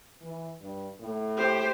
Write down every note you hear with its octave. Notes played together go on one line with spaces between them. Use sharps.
E3
G2
A2
G4 C5